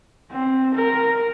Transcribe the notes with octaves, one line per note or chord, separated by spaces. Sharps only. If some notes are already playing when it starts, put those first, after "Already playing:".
C4
A#4